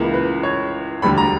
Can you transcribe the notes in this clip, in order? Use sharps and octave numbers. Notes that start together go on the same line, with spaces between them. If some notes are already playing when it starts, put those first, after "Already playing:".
Already playing: C#2 C#3 E3 A#3
B4
C#5
E1 D2 D3 G3 B5
A#5